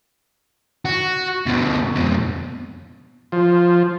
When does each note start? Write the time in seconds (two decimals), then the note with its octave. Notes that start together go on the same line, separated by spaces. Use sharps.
0.85 F#4
1.46 D2 B2
1.95 F2 B2
3.32 F3